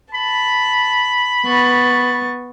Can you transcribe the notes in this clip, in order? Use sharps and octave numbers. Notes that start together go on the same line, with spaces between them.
A5 B5
B3 C#6 A6